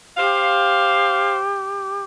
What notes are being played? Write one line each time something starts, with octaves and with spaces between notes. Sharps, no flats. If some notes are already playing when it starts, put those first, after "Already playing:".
G4 C5 F5